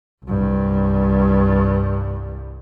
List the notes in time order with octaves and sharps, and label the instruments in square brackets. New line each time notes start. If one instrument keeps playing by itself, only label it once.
[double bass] C2 G2